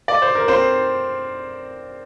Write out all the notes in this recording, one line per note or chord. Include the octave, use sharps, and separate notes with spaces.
D5
C5
A#4
C4 C5